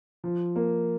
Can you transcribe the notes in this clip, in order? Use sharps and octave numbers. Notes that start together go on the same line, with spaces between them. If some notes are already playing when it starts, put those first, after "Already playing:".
F3
A#3